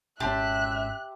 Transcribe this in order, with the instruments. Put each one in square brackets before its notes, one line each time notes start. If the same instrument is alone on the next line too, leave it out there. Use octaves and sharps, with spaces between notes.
[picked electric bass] G#1 B2 C#4 [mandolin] G4 A5 C6 [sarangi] E5 [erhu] F#6